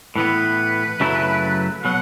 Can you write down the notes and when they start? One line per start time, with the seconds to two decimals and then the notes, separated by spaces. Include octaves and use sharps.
0.16 A2 E3 B3 B4
1.00 F#2 C#3 F#3 A3 E4
1.83 B2 F#3 F#5